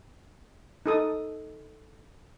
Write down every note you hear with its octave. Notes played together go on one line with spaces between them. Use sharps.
D#4 A4 D#6